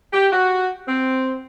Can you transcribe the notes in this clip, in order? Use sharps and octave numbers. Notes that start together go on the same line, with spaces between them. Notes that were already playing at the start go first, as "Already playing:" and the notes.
G4
F#4
C4